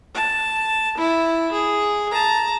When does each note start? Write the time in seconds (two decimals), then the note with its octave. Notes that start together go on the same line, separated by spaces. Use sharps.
0.14 A5
0.98 E4
1.52 G#4
2.11 A5 A#5